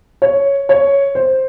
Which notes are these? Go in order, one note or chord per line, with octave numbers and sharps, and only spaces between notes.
C#5
C#5
C5